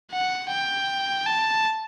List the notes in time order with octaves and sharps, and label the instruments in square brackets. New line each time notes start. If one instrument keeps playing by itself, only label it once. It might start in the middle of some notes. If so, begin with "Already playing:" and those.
[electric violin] F#5
G5
A5